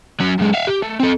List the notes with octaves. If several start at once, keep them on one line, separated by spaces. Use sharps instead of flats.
F#3 C#4
F#2 G#3
E5 F5
G4
A3
C4 A4